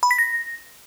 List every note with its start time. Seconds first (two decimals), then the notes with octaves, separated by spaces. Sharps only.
0.03 B5
0.11 B6
0.19 A#6